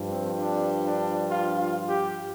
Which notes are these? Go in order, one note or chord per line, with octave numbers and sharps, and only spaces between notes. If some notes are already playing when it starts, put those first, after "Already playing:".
Already playing: G2 F3
C4
D4
D4
F4
F4
G4